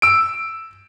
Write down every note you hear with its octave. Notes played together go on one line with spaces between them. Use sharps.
E6 D7